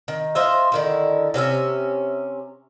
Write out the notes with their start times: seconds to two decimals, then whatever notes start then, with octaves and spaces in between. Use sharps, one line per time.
0.08 D#3
0.35 F4 C5 D#5 E5
0.72 D3 D#3 E4
1.34 C3 C#4 A4 E5